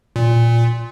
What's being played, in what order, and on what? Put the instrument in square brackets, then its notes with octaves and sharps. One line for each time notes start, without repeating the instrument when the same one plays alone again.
[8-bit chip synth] A#2